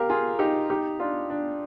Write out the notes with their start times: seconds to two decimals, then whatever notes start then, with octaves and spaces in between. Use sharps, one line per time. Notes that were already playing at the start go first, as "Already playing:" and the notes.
Already playing: G4 A#4 F5
0.10 F4 G#4
0.39 D#4 G4
0.70 D#4 G4
1.00 D4 F4
1.30 D4